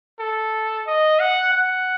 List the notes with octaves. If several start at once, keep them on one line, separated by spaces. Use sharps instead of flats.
A4
D#5
F#5
F#5